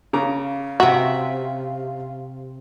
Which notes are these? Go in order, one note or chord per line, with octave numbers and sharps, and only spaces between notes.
C#3 F5 A#5 D6
C3 F#4 E5